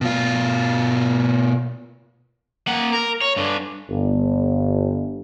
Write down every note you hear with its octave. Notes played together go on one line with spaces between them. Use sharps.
B2 F4
A#3 F#5
A#4
C#5
G2 D3
G1